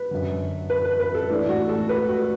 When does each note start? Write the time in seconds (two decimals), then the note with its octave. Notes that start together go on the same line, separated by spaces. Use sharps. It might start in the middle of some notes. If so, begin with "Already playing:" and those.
Already playing: B4
0.11 F#2 D3
0.70 B4
0.85 B4
1.00 B4
1.15 A4
1.30 A2 E3 D4
1.49 F#4
1.69 A4
1.89 B4
2.09 F#4